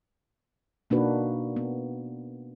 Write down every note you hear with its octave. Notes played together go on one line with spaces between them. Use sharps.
B2 A#3 D4 D#4 F#4 B4
B3